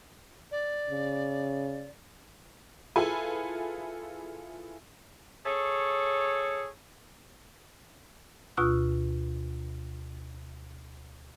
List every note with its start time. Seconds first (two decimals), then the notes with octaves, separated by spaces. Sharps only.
0.51 D5
0.90 C#3
2.96 E4 F4 G#4 A4 B4 G#5
5.46 G#4 A4 C#5
8.57 D2 B2 F4 C#6 E6 F#6